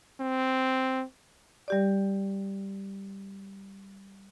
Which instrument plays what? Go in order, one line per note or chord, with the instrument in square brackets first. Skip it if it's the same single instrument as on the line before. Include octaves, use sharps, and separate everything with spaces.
[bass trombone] C4
[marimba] G3 G4 D5